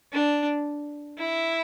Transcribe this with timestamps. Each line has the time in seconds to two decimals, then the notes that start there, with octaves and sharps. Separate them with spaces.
0.13 D4
1.19 E4